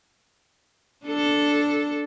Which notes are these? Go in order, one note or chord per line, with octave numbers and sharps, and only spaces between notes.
D4 A4